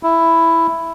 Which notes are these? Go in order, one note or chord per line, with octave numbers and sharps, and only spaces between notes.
E4